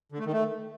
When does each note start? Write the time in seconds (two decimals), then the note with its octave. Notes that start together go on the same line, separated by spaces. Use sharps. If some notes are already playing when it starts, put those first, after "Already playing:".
0.12 D3
0.19 A3
0.26 D#3
0.33 A3